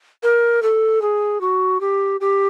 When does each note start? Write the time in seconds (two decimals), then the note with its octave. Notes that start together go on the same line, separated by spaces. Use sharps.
0.23 A#4
0.62 A4
1.02 G#4
1.41 F#4
1.81 G4
2.21 G4